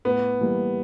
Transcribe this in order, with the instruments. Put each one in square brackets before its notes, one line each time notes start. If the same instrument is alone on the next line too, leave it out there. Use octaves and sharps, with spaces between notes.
[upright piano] A2 [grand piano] B3
[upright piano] E3 G3 A#3